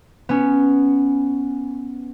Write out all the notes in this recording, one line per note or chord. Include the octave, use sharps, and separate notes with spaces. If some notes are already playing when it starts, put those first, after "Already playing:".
B3 C#4